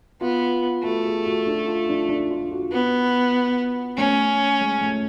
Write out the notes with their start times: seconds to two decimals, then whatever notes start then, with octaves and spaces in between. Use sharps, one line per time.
0.21 B3 F4
0.83 A3 F#4
1.05 G#4
1.26 F#4
1.47 D4
1.67 F4
1.89 D4
2.09 D4
2.31 F4
2.51 F#4
2.72 B3
3.97 A3 C#4
4.61 G#3
4.81 A3